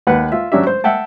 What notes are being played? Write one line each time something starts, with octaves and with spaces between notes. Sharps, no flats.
D#2 B4 F#5
F4 E5
F#3 C#4 D4 G4 E5
C5
E5 F#5 G5 A5